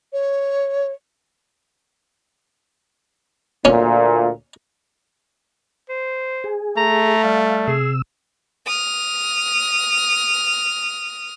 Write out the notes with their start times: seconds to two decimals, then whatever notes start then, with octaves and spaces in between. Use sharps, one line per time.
0.13 C#5
3.65 D2 A#2 C#4
5.89 C5
6.44 G#4
6.77 A3 A#5
7.24 G3 F5
7.68 C3 G#4 E6
8.67 D#6 F6